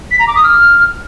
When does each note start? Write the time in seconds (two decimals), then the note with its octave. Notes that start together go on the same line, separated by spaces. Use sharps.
0.11 B6
0.19 A#5
0.27 D6
0.36 D#6
0.44 F6